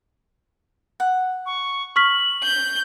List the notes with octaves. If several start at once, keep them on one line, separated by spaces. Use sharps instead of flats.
F#5
C#6
C#6 F6 B6 F#7
G6